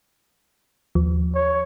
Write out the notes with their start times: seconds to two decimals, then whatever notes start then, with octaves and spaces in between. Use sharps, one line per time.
0.95 D#2 F3
1.34 C#5